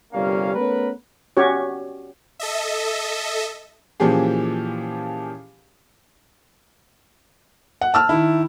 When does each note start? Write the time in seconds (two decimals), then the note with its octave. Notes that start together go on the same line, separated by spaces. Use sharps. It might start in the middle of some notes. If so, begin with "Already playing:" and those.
0.13 G1 C3 G3 A#3 C#4 F5
0.54 A3 B3 C#4 A#4 B4
1.37 C#4 F#4 G4 C#5
2.40 A4 D#5 E5
4.00 A#2 E3 F3 C#4 G4 G#4
7.81 F#5
7.94 A5 E6 F6
8.09 D#3 E4